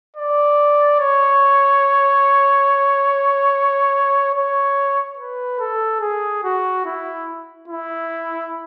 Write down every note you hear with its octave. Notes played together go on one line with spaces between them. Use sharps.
D5
C#5
C#5
B4
A4
G#4
F#4
E4
E4